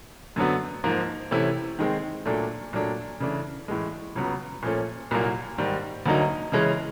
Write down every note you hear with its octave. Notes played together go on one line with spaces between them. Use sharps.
F#2 D3 F#3 B3
G#2 F3 A#3
C3 E3 A3 C#4 E4
D#3 G#3 C4
A#2 F#3 A3 D4
A#2 F#3 A3 D4
C#3 E3 A3 D4
A2 E3 G#3
C#2 C#3 F#3 B3
A#2 F3 A3 C#4
C2 A#2 F#3 A#3
G#2 D#3 G3
D2 D3 F#3 A#3 D#4
C#3 E3 G#3 C#4